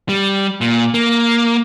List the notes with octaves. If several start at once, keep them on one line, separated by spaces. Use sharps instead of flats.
G3
A#2
A#3